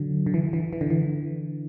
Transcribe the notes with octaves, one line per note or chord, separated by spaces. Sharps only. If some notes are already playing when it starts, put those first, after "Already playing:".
Already playing: D3 F#3
D3
E3
E3
E3
D3
E3